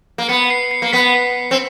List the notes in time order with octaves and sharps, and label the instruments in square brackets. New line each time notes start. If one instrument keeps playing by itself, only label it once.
[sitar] A#3
[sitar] B3 [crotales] C#7
[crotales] C7
C7
[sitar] A#3
[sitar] B3 [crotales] B6
[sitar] C4